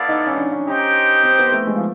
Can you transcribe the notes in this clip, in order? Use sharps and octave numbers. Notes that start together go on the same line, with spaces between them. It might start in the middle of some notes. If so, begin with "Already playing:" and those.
Already playing: B3 E4 A4 D5 F5
D#4
C#4
D4
C#4
D#4 G4 C5 D#5 G5
C4
B3
A3
G#3
F3